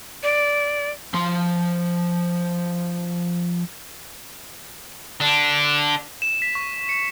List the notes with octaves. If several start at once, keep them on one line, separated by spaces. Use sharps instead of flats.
D5
F3 C6
D3 D4
E7
B6
C#6
C#7